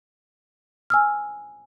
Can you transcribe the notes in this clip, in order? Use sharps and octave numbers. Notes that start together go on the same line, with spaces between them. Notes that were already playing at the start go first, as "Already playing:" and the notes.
G#5 E6 F6